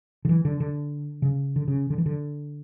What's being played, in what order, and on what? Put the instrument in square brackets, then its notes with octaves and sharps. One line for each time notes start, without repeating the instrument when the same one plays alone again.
[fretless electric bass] D3
E3
D3
D3
C#3
D3
C#3
D3
E3
D3